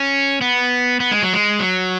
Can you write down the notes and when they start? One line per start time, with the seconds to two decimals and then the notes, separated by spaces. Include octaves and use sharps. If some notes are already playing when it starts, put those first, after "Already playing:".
Already playing: C#4
0.41 B3
1.00 B3
1.11 G#3
1.22 F#3
1.33 G#3
1.59 F#3